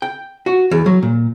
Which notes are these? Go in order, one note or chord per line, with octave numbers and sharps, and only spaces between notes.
G5
F#4
E2
F#3
A#2